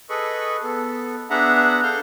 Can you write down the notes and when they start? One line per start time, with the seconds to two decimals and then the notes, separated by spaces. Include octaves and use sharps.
0.10 G#4 A4 B4 D#5 B5 C#6
0.63 B3 A4
1.30 B3 D4 G#4 E5 F#5 A#5
1.83 A4 F5 F6 G6